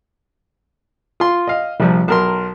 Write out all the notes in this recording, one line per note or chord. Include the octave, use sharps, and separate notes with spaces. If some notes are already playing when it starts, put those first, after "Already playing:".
F4 C6
D#5 F5
A#1 C3 F3 G3
B1 A#4 A5 C6